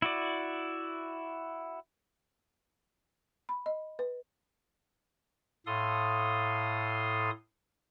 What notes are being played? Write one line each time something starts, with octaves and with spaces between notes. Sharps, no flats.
E4 F#4 D5
B5
D#5
B4
A2 A4 F5 C6 D#6